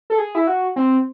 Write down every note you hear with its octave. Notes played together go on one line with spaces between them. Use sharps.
A4
G#4
E4
F#4
C4